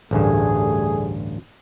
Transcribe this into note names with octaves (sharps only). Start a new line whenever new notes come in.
A1 D2 G2 G3 A3 G#4